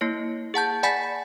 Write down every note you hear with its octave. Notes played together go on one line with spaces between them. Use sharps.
A#3 E4 C#5
G#4 F#5 A5 G6
D5 F#5 G#5 B5 A6 B6